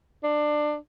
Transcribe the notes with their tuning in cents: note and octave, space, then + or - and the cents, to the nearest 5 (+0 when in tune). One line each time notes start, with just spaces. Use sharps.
D4 +20